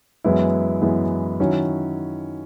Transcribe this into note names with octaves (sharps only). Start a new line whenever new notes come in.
F#2 E3 G#3 B3 E4
F#2 E3 G#3 B3 E4
D#3 F#3 C#4 E4